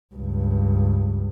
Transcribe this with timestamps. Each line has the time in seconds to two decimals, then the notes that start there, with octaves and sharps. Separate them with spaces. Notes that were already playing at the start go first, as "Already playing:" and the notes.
0.15 C#2 G2